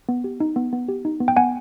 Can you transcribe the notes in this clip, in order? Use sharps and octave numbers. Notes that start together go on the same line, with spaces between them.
B3
G4
D#4
B3
B3
G4
D#4
B3
G5
B3 F#5 G#5